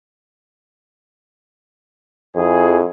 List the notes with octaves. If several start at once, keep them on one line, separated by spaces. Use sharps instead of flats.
F2 F3 E4 G#4